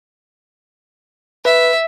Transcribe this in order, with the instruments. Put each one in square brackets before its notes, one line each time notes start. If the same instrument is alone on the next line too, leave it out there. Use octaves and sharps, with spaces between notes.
[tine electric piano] B4 [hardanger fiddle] E5